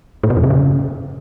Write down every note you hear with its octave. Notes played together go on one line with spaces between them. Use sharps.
A2
B2
F2
C3
C#3